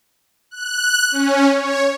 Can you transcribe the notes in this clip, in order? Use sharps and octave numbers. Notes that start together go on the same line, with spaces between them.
F#6
C#4
C#5